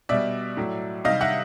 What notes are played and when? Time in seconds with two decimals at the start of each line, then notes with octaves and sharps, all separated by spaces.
0.09 B2 G3 D5 E5
0.57 A2 F#3
1.04 C3 D#3 G3 D#5 F5
1.21 E5 F#5